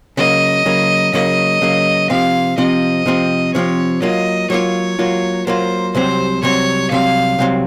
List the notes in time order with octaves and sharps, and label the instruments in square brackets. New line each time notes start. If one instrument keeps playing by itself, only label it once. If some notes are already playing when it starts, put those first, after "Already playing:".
[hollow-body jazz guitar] C#3 F#3 A#3 [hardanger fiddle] D#5
[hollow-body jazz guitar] C#3 F#3 A#3
[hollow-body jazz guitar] C#3 F#3 A#3 [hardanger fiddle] D#5
[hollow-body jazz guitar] C#3 F#3 A#3
[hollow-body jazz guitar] C3 F3 C4 [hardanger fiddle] F5
[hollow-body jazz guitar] C3 F3 C4 [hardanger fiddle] D#5
[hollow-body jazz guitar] C3 F3 C4
[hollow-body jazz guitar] C3 F3 C4 [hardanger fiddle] C#5
[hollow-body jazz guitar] F#3 A#3 F4 [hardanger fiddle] D#5
[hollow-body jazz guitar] F#3 A#3 F4 [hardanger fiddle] C#5
[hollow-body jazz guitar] F#3 A#3 F4
[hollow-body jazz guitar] F#3 A#3 F4 [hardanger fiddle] C5
[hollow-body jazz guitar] C2 C3 F#3 C4 [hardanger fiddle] C5
[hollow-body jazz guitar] C2 C3 F#3 C4 [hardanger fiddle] C#5
[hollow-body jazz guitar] C2 C3 F#3 C4 [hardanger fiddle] F5
[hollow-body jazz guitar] C2 C3 F#3 C4